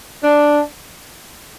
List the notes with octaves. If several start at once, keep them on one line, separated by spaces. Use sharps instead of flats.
D4